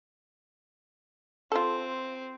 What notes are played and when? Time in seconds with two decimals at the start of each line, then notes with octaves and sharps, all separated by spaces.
1.52 C4 F4 A4